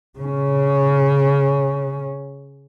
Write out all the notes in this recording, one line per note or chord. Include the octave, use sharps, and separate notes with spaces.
C#3 C#4